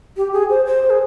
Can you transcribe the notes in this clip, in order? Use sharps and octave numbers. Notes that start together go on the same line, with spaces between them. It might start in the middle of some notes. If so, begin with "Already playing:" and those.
G4
G#4
C5
C5
G#4